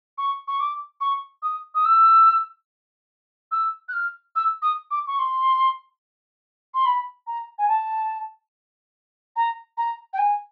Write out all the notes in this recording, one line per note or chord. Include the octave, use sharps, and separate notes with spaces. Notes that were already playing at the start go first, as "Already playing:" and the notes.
C#6
C#6
D6
C#6
D#6
D#6
E6
E6
F#6
F6
E6
D#6
D6
C#6
C6
C6
B5
A#5
G#5
A5
A#5
A#5
G5
G#5